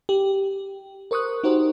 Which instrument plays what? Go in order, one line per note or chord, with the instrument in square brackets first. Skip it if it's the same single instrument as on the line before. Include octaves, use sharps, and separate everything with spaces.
[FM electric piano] G4
A#4 C5 C#6 D#6 F#6
D#4 F#4 G4 A#4 C5